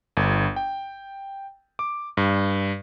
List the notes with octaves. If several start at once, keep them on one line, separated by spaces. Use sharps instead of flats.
G1
G5
D6
G2